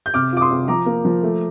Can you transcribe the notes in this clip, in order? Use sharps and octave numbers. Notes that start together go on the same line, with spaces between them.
G6
C3 D6 F6
F4 D6
C6 D#6
C3
F3 A#5 D6
A#3
F3
A3